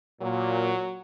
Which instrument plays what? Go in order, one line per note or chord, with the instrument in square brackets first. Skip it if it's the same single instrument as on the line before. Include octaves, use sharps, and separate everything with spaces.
[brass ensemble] A#2 [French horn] F#3